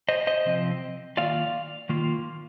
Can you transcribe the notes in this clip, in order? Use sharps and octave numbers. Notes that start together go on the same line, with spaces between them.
C5 D#5
C5 D#5
C3 F3 C4
D#3 A#3 F4 D5 F5
D#3 A#3 F4